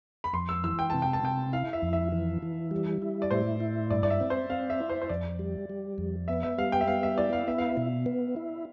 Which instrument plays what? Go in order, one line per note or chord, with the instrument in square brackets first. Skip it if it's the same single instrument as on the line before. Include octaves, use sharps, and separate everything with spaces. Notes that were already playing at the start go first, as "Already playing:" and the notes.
[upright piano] B5
[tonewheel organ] F2 [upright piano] C6
[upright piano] E6
[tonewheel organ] E3 [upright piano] E6
[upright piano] G5
[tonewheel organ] C3 [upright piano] A5
[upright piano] G5
A5
[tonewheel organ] C3 [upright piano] G5
[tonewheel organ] E4 [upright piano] F5
[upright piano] E5
[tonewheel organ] F2
[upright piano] E5
[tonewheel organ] E3
E3
G3
E4
[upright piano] D5
[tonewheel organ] A2 [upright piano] C5
[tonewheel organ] E4
[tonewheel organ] G2 [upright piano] D5
[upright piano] D5
E5
[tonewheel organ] C4
[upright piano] C5
[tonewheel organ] C4 [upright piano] F5
[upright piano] E5
[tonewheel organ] E4
[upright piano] C5
C5
[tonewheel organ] F2 [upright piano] D5
[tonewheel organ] G3
G3
F2
[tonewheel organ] B3 [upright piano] E5
[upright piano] E5
[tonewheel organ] G3 [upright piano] F5
[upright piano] G5
E5
[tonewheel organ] B3 [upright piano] F5
[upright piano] E5
[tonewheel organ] E4 [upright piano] D5
[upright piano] F5
[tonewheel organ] B3 [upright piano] E5
[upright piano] F5
E5
[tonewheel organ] B2
B3
E4